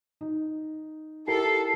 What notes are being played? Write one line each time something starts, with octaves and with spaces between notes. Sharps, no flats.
D#4
E4 G4 A4 A#4 C7